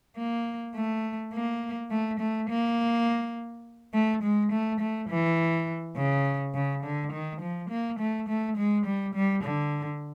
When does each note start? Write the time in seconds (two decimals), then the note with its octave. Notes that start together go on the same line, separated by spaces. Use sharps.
0.17 A#3
0.75 A3
1.33 A#3
1.91 A3
2.20 A3
2.49 A#3
3.94 A3
4.23 G#3
4.52 A3
4.80 A3
5.10 E3
5.97 C#3
6.54 C#3
6.84 D3
7.13 D#3
7.41 F3
7.70 A#3
8.00 A3
8.29 A3
8.58 G#3
8.86 G3
9.15 G3
9.44 D3